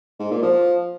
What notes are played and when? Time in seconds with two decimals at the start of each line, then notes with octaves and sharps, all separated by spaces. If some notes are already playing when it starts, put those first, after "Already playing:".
0.19 G#2
0.31 A#2
0.43 F3